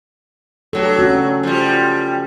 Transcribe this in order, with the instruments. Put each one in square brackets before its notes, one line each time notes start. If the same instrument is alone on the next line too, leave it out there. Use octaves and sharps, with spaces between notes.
[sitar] G2 F#3 [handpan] A4
[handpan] C#4 F#4
[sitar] F3 G3